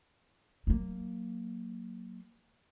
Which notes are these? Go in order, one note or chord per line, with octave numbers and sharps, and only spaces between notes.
F#3 A#3